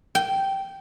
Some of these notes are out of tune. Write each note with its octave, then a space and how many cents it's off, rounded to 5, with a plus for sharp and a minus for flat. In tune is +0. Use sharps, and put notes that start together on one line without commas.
G5 -10